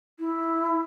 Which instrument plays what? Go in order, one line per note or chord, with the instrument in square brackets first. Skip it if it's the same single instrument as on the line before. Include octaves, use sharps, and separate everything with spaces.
[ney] E4